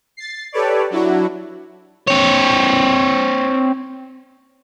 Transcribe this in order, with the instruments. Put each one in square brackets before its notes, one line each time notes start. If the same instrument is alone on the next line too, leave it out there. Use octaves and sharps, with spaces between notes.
[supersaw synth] A6 C7
G4 A4 B4 C#5 D5
F#3 D4 E4 F#4
[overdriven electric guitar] C4 C#5